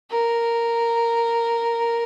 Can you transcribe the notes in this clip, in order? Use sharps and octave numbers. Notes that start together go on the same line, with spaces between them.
A#4